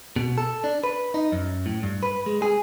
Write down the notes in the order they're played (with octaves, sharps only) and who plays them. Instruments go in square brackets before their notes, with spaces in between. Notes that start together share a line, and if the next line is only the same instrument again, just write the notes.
[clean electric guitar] B2
A4
D4
B4
D#4
F#2
A2
G2
B4
G#3
G#4